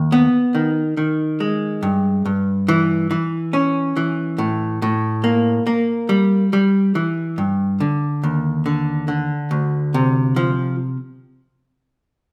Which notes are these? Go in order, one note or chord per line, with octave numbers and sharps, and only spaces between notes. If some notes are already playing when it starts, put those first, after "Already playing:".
Already playing: D#2
B3
D#3
D#3
G#3
G2
G2
E3
E3
C#4
E3
A2
A2
A#3
A#3
G3
G3
E3
G2
D3
D#2
D3
D3
D2
C3
F3